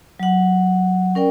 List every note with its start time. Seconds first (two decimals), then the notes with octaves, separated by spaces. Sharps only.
0.19 F#3 F#5
1.15 C#4 A#4 D5 G5